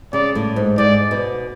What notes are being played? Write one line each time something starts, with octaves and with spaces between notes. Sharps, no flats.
C#3 D5
A2
G#2
G#2 D5
B2